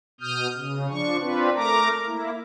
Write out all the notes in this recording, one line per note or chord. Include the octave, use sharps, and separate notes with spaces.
B2 D#6 F6 G6
C#3
F3 D4 C#6
C4 D4 F4 B4
A3 A#4 A#5 D6
A#3 E4